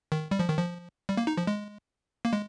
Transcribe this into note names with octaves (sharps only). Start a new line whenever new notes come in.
D#3
G3
F3
D#3
F3
G3
A#3
D#4
F3
G#3
A#3
G#3